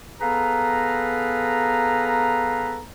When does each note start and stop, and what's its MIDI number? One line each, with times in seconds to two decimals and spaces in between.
0.21 2.80 59
0.21 2.80 68
0.21 2.80 69
0.21 2.80 71
0.21 2.80 77
0.21 2.80 82